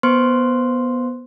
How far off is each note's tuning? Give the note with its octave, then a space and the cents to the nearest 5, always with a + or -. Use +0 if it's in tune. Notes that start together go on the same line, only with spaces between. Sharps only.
B3 -15 C5 -15 C6 +0